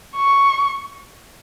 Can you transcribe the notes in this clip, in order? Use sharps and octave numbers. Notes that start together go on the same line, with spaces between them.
C#6